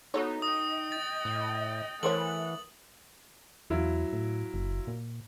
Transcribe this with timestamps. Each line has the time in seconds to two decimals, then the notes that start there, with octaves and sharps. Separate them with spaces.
0.14 B3 D#4 F#4 A4 C#5
0.42 D#5 G5 D#6
0.92 A6
1.25 A2
2.03 E3 A3 A#4 C5 C#5 F#5 F#7
3.70 E2 F#3 E4 F4
4.13 A2
4.54 F#1
4.87 A#2